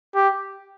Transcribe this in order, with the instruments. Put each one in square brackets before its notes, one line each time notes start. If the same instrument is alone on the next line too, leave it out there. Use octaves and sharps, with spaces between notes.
[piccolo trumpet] G4